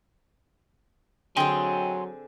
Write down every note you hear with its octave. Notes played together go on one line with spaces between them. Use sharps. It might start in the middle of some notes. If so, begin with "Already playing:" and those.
D3 F#3 C4 G#4 D#5 G5 G#5 C6